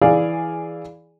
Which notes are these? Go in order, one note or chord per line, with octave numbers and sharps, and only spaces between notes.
E3 G#4 D5 F5